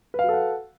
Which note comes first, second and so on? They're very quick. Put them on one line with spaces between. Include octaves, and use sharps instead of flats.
B4 F5 F#4 A4 F#5